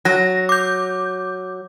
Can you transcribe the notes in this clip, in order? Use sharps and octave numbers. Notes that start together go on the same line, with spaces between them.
F#3 A#6
D6 G6